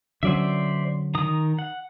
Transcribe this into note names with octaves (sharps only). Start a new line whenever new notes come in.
D3 F#3 C#4 C5 D5 E5
D#3 A#5 D#6
F#5